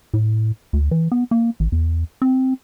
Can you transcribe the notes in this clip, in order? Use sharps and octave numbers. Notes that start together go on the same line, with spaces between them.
A2
D2
E3
B3
A#3
A1
E2
C4